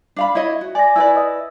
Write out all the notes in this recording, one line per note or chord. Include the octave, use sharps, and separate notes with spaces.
D4 F5 B5
E4 C#5 D#5
F#4
D5 G#5 D6 A#6
E4 B4 D5 B5 E6
D#5 D#6 E6